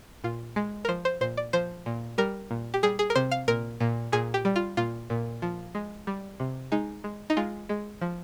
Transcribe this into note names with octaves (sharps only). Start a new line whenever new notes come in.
A#2 F4
G#3
A#4
F3 C5
C5
A#2 C5
D5
F3 C5
A#2
G3 A#4
A#2
G4
G3 G#4
G#4
A#4
C3 C5
F5
A#2 A#4
A#2
A#2 G#4
G4
G3
F4
A#2 F4
A#2
F3
G#3
G3
C3
G#3 D#4
G#3
D#4
G#3 F4
G#3
F3